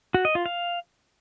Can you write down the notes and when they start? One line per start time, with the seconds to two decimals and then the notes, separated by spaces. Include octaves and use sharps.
0.14 F#4
0.25 D#5
0.35 F4
0.46 F5